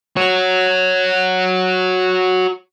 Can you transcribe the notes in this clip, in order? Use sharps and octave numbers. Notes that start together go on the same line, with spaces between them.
F#4 C#5